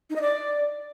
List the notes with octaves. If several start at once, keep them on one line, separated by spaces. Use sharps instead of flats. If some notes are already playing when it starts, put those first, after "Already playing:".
D#4
D#5
D5